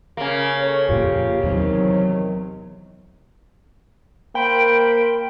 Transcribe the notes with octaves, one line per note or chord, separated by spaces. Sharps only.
C#3 A#3
A4 C#5
F2 A#2 F4 G4
E2 C3 D#3 F#3
A#3 C5 G5 B5 D7